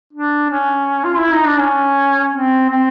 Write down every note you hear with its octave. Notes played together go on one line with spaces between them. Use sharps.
D4
C#4
F4
E4
D#4
D4
C#4
C4
C4